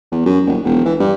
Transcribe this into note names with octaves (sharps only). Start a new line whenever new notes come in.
E2
F#2
D#1
E1
E3
G2